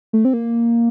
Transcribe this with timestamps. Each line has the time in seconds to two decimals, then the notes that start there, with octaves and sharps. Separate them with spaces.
0.13 A3
0.25 C4
0.33 A#3